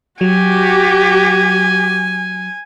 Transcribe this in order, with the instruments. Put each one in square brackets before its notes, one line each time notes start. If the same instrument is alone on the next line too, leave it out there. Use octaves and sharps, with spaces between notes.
[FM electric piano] F#3 [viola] F#4 G4 [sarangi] G#5